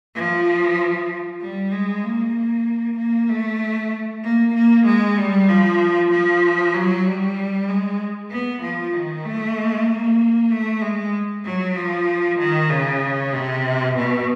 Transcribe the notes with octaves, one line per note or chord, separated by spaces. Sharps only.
F3
G3
G#3
A#3
A#3
A3
A#3
A#3
G#3
G3
F3
F3
F#3
G3
G#3
B3
F3
D#3
A3
A#3
A3
G#3
F#3
F3
D#3
C#3
C3
B2